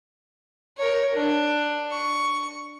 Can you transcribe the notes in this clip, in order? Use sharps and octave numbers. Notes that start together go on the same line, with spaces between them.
A#4 C#5
D4
C#6